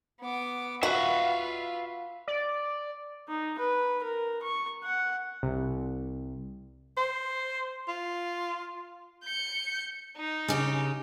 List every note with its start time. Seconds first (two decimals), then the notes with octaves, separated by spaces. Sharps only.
0.21 B3 D6
0.83 F4 F#4 B4 E5 F5
2.28 D5
3.28 D#4
3.59 B4
4.03 A#4
4.42 C#6
4.84 F#5
5.43 C2
6.97 C5
7.88 F4
9.24 G6 C#7
10.17 D#4
10.48 C#3 G4